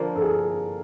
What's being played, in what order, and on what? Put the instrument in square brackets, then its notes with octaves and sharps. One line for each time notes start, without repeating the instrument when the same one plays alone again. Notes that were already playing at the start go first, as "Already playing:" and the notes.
Already playing: [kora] D3 F3 A#3 [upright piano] A#4
[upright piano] A4
G#4